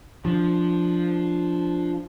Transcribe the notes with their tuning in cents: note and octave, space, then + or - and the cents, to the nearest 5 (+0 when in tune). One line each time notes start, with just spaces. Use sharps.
F3 +0 D4 +5